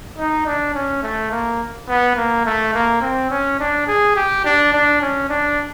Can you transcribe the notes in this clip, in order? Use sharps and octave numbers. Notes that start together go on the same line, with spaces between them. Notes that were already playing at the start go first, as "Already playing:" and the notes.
D#4
D4
C#4
A3
A#3
B3
A#3
A3
A#3
C4
C#4
D4
G#4
G4
D4
D4
C#4
D4